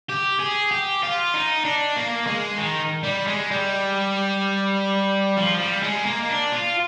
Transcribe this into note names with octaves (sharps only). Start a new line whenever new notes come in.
G4
G#4
G4
F4
D#4
D4
A#3
G#3
D#3
G3
G#3
G3
F3
G3
G#3
A#3
D4
F4